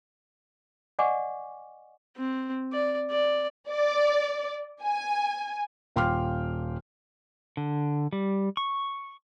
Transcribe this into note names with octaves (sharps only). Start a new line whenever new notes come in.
D5 D#5 F#5 G#5 C#6 D6
C4
D5
D5
D5
G#5
D#1 F5 G5 C6 D6 F6
D3
G3
C#6